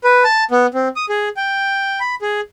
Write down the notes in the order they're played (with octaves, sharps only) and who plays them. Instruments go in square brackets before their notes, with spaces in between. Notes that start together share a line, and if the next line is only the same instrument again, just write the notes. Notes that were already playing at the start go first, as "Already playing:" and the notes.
[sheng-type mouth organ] B4
A5
B3
C4
D#6
G#4
G5
B5
G#4